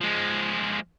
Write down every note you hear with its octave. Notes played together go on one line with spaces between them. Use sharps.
F3 G#3